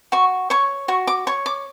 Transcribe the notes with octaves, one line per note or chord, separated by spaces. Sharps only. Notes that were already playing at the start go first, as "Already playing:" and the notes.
F#4 C#6
C#5 C#6
F#4 C#6
D6
C#5 C#6
D6